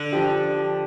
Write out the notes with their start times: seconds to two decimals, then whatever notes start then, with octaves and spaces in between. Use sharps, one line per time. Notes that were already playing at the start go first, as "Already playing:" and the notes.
Already playing: D3
0.13 F3 D4 G4